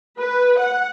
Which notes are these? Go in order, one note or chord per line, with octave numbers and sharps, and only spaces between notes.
B4
F#5